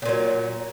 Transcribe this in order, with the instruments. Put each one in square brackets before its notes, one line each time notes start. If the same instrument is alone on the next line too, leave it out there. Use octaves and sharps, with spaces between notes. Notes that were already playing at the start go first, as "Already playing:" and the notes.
[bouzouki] C#3
A#2
F#3